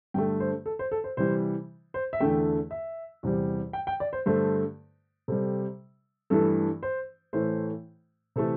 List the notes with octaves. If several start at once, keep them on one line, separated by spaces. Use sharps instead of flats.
G2 D3 A3 G5
C5
A4
C5
A4
C5
C3 E3 G3 C5
C5
E5
E2 D3 A3 G5
E5
E2 C3 G3
G5
G5
D5
C5
G2 D3 A3 C5
C3 G3 A4
G2 E3 A3 A4
C5
A2 E3 A3 C5
C3 E3 A3 A4